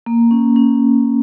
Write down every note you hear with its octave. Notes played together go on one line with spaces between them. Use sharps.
A#3
C#4
C#4